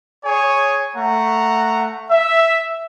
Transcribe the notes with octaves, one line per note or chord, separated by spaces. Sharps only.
G#4 C#5 G#5
A3 F#5 A#5
E5